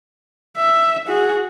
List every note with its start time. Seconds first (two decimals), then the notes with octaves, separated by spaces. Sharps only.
0.57 E5
1.07 F#4 G#4